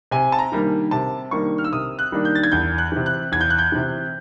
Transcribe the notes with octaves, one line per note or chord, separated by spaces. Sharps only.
C3 G#5
A5
A#5
D#3 G3 A#3 D4
C3 A5
D#3 G3 A#3 D4 C#6
F6
E6
C3 D#6
F#6
D#3 G3 A#3 D4
G6
A6
G#6
E2 G6
F#6
C3 E3
F#6
E2 G#6
G6
F#6
G6
C3 E3